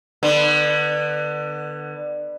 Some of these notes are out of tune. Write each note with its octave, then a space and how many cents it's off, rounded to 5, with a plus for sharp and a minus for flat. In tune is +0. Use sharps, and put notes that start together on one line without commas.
D3 +25 B3 +0